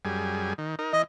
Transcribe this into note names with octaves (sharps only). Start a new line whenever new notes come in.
F#2 G3 G#4
D#3
D#4 A#4
E3 D#5